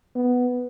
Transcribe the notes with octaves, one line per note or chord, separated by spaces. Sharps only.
B3